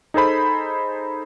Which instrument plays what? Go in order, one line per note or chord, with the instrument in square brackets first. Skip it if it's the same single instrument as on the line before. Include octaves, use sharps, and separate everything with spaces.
[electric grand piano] D#4 G#4 A4 C5 B5